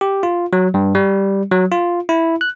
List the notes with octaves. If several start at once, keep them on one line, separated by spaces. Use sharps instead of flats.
G4
F4
F#3
G2
G3
F#3
F4
E4
F#6